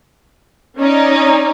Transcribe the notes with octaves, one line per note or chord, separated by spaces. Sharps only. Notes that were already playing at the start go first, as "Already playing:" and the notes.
C#4 D#4 D5